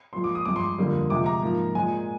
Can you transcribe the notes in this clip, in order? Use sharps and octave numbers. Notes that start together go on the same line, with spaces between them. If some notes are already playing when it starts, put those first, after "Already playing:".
A#2 F3 G#3 C6
D6
D#6
G2 F3 G#3 D6
C6
F2 D3 G3 A#3
C3 F3 G#3 D6
A#5
G#2 F3 A#3
A#2 G#3 G#5